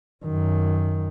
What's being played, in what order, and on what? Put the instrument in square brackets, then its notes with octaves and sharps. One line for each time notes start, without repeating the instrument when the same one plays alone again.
[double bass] F#2 D#3